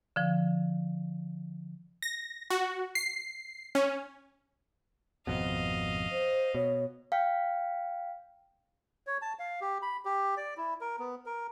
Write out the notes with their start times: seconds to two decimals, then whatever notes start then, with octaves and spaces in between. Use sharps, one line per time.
0.16 D3 F3
2.02 A#6
2.50 F#4
2.95 C7
3.75 C#4
5.27 G#1 F2 B2 D#5 F5
6.11 C5
6.55 B2 C#5
7.12 F5 G5
9.07 C#5
9.22 A5
9.39 F5
9.61 G4
9.82 B5
10.05 G4
10.37 D5
10.57 E4
10.81 A#4
10.99 B3
11.26 A#4